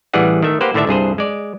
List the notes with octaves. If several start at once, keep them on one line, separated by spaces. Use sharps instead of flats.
A1 E3 G3 G#4 F#5
D#3 A3 E5
A#3 G4 B4 C5 F#5
A2 D3 D#3 D4 E5
C2 G2 G#4 C5
G#3 D5